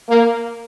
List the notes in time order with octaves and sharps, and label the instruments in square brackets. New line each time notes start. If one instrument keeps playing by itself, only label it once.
[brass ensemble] A#3